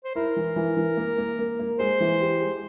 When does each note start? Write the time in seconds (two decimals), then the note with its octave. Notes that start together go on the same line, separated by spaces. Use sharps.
0.04 C5
0.15 E4 A#4
0.36 E3
0.56 E3
0.77 E3
0.97 A#3
1.18 A#3
1.39 A#3
1.59 A#3
1.79 G#3 C5
2.00 E3
2.21 G4
2.41 G#3